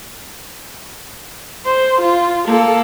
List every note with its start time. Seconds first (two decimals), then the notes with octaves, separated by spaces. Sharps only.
1.66 C5
2.01 F4
2.47 A#3 A4